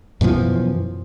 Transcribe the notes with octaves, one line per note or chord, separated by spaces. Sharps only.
F#2 B2 E3 F3